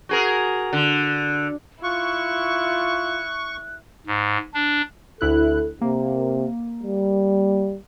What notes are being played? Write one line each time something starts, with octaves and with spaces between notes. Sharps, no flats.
F#4 G#4 A#4
D3
E4 F4 C#6 F#6
G#2
D4
D2 E4 A4 F#6
C3 A#3
G3